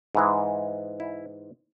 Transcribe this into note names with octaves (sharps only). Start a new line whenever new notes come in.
G#2 E3 G#3
E4